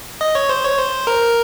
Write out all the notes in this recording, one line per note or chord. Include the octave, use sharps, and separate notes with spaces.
D#5
C#5
C5
C#5
C5
A#4